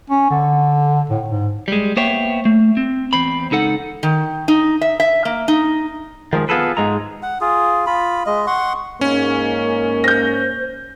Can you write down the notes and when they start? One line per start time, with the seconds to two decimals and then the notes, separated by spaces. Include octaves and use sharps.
0.10 C#4
0.31 D3
1.10 A2
1.28 G#2
1.68 G3 G#3
1.97 A#3 B3 C5 C#5 E5 G5
2.45 A3
2.77 C4
3.13 E2 C4 B5
3.51 C#2 D#4 A4 F#5
4.03 D#3
4.48 D#4
4.81 E5
5.00 E5
5.25 A#3
5.48 D#4
6.33 D#3 F3 G#3
6.49 B3 F4 G#4 A4 B4
6.77 G#2 G#3 A#5
7.23 F#5
7.41 F4 G#4
7.86 F4 B5
8.26 G#3 D#5
8.47 F#5 C6 C#6
9.01 G#2 A#3 C#4
10.04 C5 G6 A#6